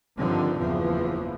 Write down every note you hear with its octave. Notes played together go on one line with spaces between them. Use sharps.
G2 D3 D#3 F3 C4
F#1 E2 E3 F3